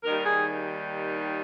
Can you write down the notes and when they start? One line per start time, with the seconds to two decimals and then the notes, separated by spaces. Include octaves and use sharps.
0.04 D#2 D#3 G3 A#4
0.24 G#4